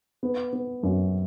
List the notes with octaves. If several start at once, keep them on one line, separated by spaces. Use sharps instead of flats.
B3
B3
F#2